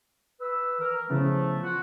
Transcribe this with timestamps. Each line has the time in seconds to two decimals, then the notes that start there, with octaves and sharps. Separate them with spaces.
0.40 B4 E6
0.80 E3 A#4
1.10 C#3 E3 F3 A3 B3
1.63 F4 F#4